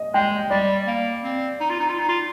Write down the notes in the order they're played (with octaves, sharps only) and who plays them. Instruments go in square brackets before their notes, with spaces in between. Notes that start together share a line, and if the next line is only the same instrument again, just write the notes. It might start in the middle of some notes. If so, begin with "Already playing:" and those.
Already playing: [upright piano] D#5
[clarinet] G#3 [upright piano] G5
[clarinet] G3 [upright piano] D5
[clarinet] A#3
C4
D#4
F4
D#4
F4
D#4
F4